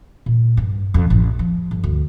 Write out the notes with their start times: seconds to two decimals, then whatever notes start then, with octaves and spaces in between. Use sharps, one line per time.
0.26 A#2
0.57 G2
0.94 F2
1.10 A1
1.39 F3
1.71 G1
1.84 D2